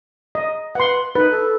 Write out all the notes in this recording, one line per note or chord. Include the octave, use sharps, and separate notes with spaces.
D#5
B4 F#5 C6
D#4 B4
A4